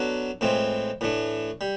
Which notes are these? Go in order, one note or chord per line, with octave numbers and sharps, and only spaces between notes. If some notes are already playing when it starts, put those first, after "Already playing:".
Already playing: F#3 B3 D4 F#4 A4
A2 E3 G#3 C4 F4
A2 E3 A3 D4
G3